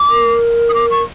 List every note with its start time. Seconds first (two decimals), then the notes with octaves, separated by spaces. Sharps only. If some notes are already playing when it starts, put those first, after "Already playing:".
Already playing: D6
0.09 A#4
0.69 D#6
0.74 D6
0.91 C#6